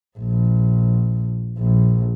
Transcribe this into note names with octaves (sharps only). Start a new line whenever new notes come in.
A#1
A#1